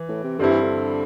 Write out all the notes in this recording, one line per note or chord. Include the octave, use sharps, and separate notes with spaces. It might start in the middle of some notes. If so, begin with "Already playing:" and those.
Already playing: E3
A2
C3
G2 D3 G3 C4 E4
E3
D3